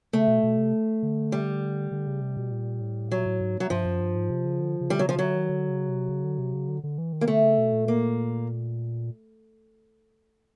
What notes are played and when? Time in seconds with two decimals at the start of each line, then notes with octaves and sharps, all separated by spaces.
0.13 C#3 A3
0.28 B2
0.43 B2
0.58 C3
1.03 D3
1.32 G3
1.92 D3
2.07 C#3
2.21 C3
2.37 B2
2.52 A#2
2.81 A2
3.11 A#2 F#3
3.26 A2
3.41 G#2
3.60 F#3
3.70 G2 F3
3.85 F#2
4.00 G2
4.15 G#2
4.30 C3
4.45 C#3
4.60 D3
4.81 C#3
4.90 D3 G3
4.99 F#3
5.05 C#3 F3
5.19 D3 F#3
5.35 D#3
5.49 D3
5.69 C#3
5.89 C3
6.09 C#3
6.24 D3
6.39 C3
6.54 C#3
6.68 D3
6.84 D3
6.98 E3
7.13 D#3
7.21 A#3
7.28 D3 A3
7.43 C#3
7.58 B2
7.73 A#2
7.88 A#3